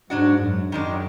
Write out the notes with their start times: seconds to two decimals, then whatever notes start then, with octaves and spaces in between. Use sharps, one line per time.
0.10 G#2 F#3 D4 F#4
0.42 F#2
0.72 F#2 D#3 G#3 D4